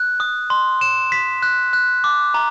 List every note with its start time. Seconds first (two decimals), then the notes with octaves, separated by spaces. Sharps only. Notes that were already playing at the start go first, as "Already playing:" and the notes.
Already playing: F#6
0.20 D#6
0.50 C6
0.81 E7
1.12 B6
1.42 F#6
1.73 F#6
2.04 D6
2.34 A#5